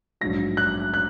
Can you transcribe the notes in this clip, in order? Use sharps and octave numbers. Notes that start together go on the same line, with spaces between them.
A#1 G#2 F#3 A#6
F#6
F#6